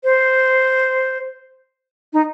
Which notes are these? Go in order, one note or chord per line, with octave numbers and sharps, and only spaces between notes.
C5
D#4